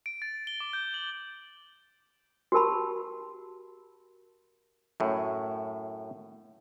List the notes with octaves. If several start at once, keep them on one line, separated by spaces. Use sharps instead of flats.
D7
A6
G7
D6
G6
F#7
F#4 G4 A#4 A5 B5
F#2 A2